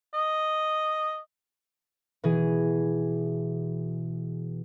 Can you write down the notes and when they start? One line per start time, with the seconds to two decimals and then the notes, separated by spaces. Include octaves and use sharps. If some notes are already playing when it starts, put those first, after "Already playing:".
0.14 D#5
2.24 B2 E3 G#4